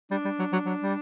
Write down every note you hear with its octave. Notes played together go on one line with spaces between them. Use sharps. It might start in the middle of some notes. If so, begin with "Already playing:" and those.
G3 D4
G3
F#3
F#3
F#3
G3